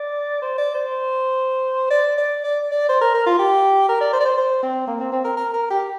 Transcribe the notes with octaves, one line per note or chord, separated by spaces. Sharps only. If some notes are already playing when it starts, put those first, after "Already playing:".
Already playing: D5
C5
D5
C5
D5
D5
D5
D5
C5
A#4
A#4
F4
G4
A#4
D5
C5
D5
C5
C5
C4
A#3
C4
C4
A#4
A#4
A#4
G4